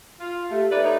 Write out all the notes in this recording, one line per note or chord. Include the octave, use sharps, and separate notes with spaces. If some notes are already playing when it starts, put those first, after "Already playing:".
F4
A3 G4
D#4 A4 B4 D5 E5
D#4 C#5